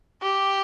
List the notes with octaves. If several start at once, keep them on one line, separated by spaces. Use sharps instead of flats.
G4